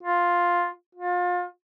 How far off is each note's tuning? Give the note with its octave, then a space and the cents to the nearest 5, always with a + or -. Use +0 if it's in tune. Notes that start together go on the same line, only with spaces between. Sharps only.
F4 +5
F4 +30